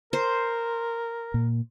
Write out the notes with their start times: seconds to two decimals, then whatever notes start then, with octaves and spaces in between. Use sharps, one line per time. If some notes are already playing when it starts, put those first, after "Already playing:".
0.13 A#4 C5
1.34 A#2